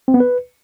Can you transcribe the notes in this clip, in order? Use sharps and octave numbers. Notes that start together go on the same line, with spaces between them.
C4
B3
B4